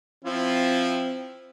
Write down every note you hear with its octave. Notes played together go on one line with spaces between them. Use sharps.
F3 C4 E4 F4